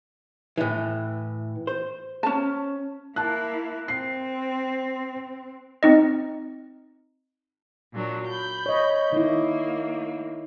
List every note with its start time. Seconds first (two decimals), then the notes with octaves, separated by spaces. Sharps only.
0.57 A2 E3
1.67 C5
2.23 C#4 A5
3.16 A#3 E4 A5 F#6
3.88 C4 C7
5.83 C4 D#4 D#5
7.93 A#2 F#3 D4
8.28 B5 G6
8.66 C#5 D#5
9.12 D#3 A#3 E4